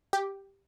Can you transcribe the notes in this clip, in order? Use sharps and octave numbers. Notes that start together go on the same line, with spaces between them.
G4